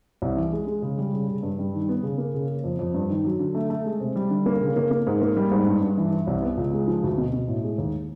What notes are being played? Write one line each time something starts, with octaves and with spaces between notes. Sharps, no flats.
C2
E3
G#3
G#3
C#3
G3
C#3
C#3
G2
G3
D#3
B3
C#3
A#3
C#3
C#3
F2
F2
G2
D#3
F#3
D3
A3
A3
G#3
C3
G3
D3
A#3
C#3
A#3
A#3
G#2
A#3
G3
G#2
G2
G2
E3
E3
C2
B3
C#2
G#3
F3
D2
B2
B2
A2
G#3
D#2